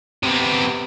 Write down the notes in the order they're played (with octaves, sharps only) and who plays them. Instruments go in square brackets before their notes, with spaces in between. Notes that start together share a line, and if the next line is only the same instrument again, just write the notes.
[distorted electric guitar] C3 B3